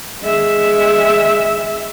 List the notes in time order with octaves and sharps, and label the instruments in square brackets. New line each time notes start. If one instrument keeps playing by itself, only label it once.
[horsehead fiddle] G#3 E5